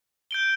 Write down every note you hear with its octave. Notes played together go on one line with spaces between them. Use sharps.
G6 D7 G7